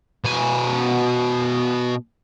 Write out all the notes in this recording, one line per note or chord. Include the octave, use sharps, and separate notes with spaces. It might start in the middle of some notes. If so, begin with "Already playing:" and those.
B2 G#5